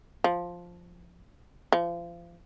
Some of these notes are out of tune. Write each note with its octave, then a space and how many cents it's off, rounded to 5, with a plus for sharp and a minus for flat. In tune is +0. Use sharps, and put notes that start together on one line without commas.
F3 +5
F3 -30